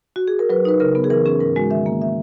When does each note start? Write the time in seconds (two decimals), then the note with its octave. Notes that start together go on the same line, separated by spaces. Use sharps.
0.16 F#4
0.28 G#4
0.39 A#4
0.49 F#3 B4
0.65 D#4 B4
0.80 C#3 A#4
0.95 B3
1.04 G#4
1.10 E3 A#4
1.26 C#4 G#4
1.40 G#2 A#4
1.56 G#3 F#4
1.70 D#3 E5
1.86 A#3
2.02 E5